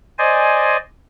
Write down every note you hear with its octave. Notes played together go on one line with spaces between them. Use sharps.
C5 D5 D#5 G#5